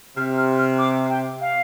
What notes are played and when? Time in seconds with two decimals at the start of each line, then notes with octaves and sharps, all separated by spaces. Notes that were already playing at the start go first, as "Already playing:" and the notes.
0.16 C3 F6
0.38 F6
0.59 F6
0.78 D6
1.10 G5
1.41 F5